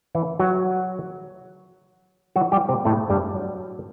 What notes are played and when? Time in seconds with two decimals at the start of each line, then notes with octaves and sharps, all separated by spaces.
0.15 E3 E4
0.39 F#3 F#4
2.36 F#3 F#4
2.52 G3 G4
2.69 C3 C4
2.85 A2 A3
3.10 G2 G3
3.34 F#3